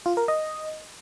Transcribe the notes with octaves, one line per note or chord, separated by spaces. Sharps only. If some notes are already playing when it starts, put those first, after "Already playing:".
F4
A#4
D#5